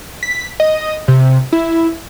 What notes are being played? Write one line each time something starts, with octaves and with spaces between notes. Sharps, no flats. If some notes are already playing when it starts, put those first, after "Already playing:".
B6
D#5
C3
E4